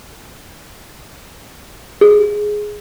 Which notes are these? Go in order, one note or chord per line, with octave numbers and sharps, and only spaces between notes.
G#4